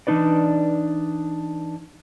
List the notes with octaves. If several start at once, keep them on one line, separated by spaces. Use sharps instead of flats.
E3 F#3 D4 D#4 B4 D5